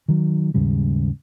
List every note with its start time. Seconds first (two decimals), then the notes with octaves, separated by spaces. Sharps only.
0.08 D#3 F#3
0.54 D#2 G#2 C#3 G3